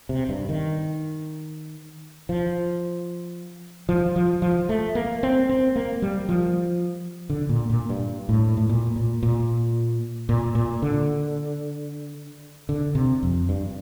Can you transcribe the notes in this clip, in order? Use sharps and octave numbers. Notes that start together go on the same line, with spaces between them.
C3
G2
D#3
F3
F3
F3
F3
A3
A#3
C4
C4
A#3
G3
F3
D3
A#2
A#2
G2
A2
A2
A#2
A#2
A#2
A#2
A#2
D3
D3
C3
F2
G2